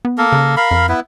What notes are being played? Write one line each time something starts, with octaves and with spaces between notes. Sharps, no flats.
B3
A#3 A4 A#4
C#3
A#4 F5 B5
F2
B3 E4 B4